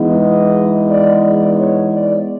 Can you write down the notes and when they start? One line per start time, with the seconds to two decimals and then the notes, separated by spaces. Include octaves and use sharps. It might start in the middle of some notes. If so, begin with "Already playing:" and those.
Already playing: E3 G#3 B3 D#4
0.18 D#5
0.88 D5
1.23 D5
1.59 C#5
1.94 D5